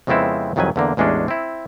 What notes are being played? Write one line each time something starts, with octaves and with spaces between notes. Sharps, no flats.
F2 C#3 G#3 B3 C4 E4
C2 F2 D#3 F#3 B4 G#5
E2 D3 A#3
A1 E2 G#3 C#4 D4 G#4
C4 E4